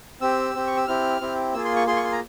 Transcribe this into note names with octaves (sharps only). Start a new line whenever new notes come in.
C4 G4 E6
C4 G4
C#6
E6
C4 E4 G4 F6
C4 E4 G4
A#3 F4 G#4 E6
C6
C#6
A#3 F4 G#4 C6
C#6
C6
A#5